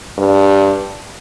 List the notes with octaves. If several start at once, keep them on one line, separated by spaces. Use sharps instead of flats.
G2